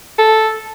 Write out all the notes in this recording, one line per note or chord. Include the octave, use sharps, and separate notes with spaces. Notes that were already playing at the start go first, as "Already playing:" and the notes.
A4